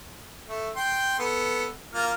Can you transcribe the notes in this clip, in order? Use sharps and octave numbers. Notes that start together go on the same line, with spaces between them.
A3
G5 C6
B3 A4
A#3 F4 F6